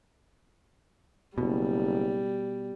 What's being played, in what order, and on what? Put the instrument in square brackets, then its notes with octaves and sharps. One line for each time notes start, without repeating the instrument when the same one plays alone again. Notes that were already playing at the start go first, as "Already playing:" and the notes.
[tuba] F#1 [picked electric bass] B2 [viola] G3